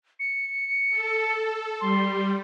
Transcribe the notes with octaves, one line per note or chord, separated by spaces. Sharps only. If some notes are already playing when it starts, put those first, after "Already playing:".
C#7
A4
G3 C6